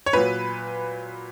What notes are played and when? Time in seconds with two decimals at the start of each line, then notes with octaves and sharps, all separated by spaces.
0.06 C#5
0.13 A#2 F#3 B4